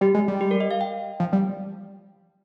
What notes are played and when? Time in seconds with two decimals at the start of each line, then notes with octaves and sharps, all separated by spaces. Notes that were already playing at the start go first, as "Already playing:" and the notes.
0.01 G3 G4
0.15 G#3
0.28 G3
0.41 G4
0.51 A#4
0.60 D#5
0.71 F5
0.81 G5
1.20 F3
1.33 G3